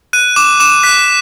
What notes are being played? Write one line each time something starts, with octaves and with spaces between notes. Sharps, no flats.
F#6 D#7
D6 E7
D6 E7
F#6 B6